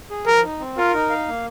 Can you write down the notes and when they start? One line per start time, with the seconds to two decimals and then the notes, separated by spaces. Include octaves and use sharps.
0.10 G#4
0.26 F3 A#4
0.44 D#4
0.60 C4
0.77 F4 A#4
0.94 D#4
1.10 F5
1.28 A#3